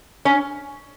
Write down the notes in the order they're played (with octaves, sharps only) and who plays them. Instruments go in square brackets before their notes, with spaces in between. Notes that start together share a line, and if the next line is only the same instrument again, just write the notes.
[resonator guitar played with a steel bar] C#4